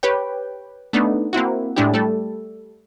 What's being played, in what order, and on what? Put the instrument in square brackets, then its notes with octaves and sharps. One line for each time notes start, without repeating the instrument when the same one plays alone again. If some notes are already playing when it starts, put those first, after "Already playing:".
[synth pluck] G4 B4 C#5 G5
A3 B3 D4 D#4
A#3 C4 E4 F#4
A2 G#3 D4 E4 G4
G3 A3 A4